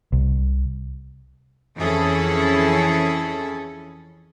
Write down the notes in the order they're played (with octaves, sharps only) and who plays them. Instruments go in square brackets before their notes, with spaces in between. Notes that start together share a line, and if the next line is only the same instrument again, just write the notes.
[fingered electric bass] C2
[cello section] F2 E3 C#4 E4 G#4 A4